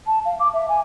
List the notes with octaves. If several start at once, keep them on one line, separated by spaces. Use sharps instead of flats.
A5
F5
D6
E5
G#5